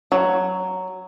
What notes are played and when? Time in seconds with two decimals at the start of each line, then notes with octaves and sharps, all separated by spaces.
0.12 F#3